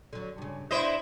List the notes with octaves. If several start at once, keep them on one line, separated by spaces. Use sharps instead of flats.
D3 F#3
G2 C#3
D4 E4 B4 C5 D5 D#5